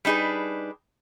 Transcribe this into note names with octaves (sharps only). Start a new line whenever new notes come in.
G3 D4 D#4 G#4 B4